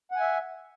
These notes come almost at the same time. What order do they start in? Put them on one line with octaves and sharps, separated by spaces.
F#5 G#5 E5